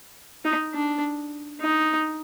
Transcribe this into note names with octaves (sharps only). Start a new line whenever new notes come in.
D#4
D4
D#4